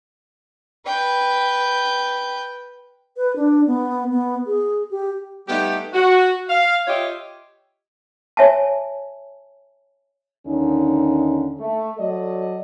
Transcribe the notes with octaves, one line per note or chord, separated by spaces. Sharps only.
B4 G5
B4
D4
B3
B3
G#4
G4
G3 A3 B3 D#4 G4
F#4
F5
F4 G4 C#5 D#5 E5
C#5 E5 G#5 A5
D#2 D3 C#4 D#4
A3
F#3 A4 D5 D#5